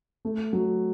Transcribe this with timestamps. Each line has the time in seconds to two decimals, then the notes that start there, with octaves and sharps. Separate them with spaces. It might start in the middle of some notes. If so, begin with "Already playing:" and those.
0.25 A3
0.53 F#3